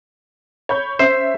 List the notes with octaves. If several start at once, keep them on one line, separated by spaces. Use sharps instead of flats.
C#5 B5 G6
C#4 C5 E5